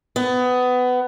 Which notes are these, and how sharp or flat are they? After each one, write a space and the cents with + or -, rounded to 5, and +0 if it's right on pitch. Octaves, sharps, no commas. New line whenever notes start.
B3 +20